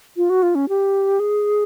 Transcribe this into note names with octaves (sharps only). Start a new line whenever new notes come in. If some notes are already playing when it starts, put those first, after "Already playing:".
F4
F#4
F4
C#4
G4
G#4